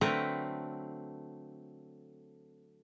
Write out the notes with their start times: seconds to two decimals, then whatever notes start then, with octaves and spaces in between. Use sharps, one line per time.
0.01 D3 F#3 A3 C4 A#4 B4